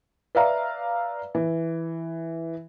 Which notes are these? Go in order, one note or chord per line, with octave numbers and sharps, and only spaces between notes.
B4 D5 E5 F5 A#5
E3